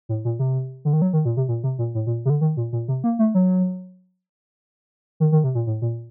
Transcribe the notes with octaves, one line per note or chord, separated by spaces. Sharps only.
A2
A#2
C3
D3
D#3
F#3
D#3
A#2
C3
A#2
C3
A#2
A2
A#2
C3
D3
D#3
A#2
A#2
C3
A#3
A3
F#3
D#3
D#3
C3
A#2
A2
A#2